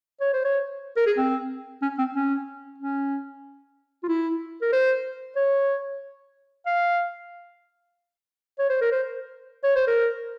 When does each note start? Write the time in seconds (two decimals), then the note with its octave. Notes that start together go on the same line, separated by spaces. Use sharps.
0.20 C#5
0.33 C5
0.44 C#5
0.97 A#4
1.06 G#4
1.17 C4
1.82 C#4
1.98 C4
2.15 C#4
2.78 C#4
4.03 F4
4.08 E4
4.61 A#4
4.72 C5
5.36 C#5
6.66 F5
8.59 C#5
8.69 C5
8.81 A#4
8.92 C5
9.64 C#5
9.76 C5
9.87 A#4